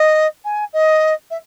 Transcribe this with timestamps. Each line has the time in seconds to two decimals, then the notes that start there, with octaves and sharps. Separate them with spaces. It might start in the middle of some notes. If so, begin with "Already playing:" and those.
Already playing: D#5
0.45 G#5
0.73 D#5
1.31 E5